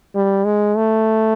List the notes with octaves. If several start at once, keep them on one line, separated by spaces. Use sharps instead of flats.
G3
G#3
A3